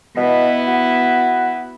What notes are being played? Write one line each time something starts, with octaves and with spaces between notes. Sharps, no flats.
B2 B3 E4
F#4